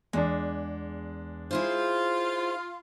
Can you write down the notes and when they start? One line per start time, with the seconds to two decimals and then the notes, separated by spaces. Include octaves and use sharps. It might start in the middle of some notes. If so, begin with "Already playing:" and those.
0.13 E2 G#3 D4
1.51 E4 F4 G#4 C5